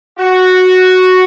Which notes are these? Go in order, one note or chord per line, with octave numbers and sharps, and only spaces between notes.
F#4